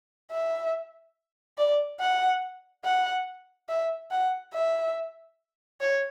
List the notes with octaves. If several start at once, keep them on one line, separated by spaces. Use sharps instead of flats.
E5
D5
F#5
F#5
E5
F#5
E5
C#5